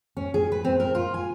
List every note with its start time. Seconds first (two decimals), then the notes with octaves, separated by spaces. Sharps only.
0.17 C#4
0.34 G#4
0.52 B4
0.64 C4
0.80 A#4
0.95 F4
1.14 G#5